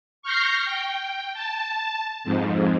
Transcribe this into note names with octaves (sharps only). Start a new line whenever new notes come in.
C#6 F6 G6 A#6 C7
G5
A5
F2 G#2